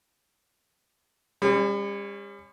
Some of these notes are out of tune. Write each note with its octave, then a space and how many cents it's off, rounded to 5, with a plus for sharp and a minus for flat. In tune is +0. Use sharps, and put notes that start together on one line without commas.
G3 +45 C#4 -15